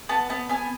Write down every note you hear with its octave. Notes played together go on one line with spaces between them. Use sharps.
B3 A5
B3 A5
B3 G#5